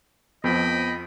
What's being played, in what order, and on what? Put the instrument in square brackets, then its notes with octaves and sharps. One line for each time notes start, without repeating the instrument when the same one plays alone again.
[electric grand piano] F2 F3 [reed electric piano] B3 [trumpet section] D#5 G5 B5